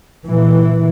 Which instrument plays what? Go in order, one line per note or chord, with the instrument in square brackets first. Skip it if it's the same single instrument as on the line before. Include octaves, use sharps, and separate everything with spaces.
[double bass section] A#2 E3